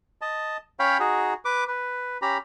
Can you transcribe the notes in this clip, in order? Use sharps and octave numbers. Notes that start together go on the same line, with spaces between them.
D#5 A5
C#4 C#5 F5 G5 B5
D#4 F#4 G#4
B4 D6
B4
C#4 G4 A#5 B5